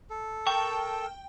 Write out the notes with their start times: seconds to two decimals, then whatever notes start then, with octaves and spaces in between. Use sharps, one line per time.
0.10 A4
0.47 A#4 G5 A5 C#6